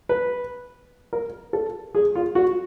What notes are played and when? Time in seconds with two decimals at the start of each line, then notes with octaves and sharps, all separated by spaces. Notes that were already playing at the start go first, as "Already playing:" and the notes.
0.09 B4
1.13 A#4
1.53 A4
1.95 G#4
2.15 F4
2.35 F#4